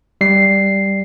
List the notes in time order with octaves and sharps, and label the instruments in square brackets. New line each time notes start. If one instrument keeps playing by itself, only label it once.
[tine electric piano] G3 C7